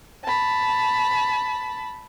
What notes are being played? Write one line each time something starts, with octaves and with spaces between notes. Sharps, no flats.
A5 B5